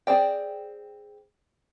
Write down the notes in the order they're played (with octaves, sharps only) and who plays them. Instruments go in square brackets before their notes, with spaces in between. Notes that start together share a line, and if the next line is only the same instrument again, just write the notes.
[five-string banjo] C4 G#4 D5 G5